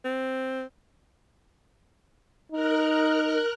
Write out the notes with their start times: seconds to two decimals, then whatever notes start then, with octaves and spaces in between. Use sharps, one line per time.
0.05 C4
2.52 D#4 A#4 F6 F#6